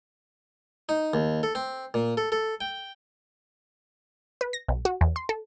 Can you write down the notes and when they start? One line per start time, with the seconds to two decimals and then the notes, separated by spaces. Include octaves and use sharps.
0.89 D#4
1.14 D#2
1.43 A4
1.55 C4
1.94 A#2
2.17 A4
2.32 A4
2.61 G5
4.41 B4
4.53 A#6
4.68 B1
4.85 F#4
5.01 E2
5.16 C6
5.29 A4